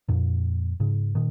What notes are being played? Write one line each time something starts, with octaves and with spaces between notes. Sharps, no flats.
F2 A#2
G#2 C#3
A#2 D#3